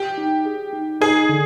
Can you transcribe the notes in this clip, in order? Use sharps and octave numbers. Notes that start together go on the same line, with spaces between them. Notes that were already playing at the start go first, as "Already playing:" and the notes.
Already playing: G4
D#4
G#4
D#4
D#4 G#4
D3